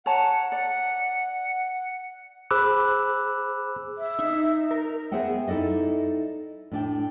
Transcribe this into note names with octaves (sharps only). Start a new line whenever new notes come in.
C#5 F#5 A5 A#5
D5
G#4 C5 B5 D6 E6 F#6
E5
D#4
A#4
B3 G#4 C5 E5 F#5 G5
D#4 E4 A4 D5 D#5
A2 D4 G5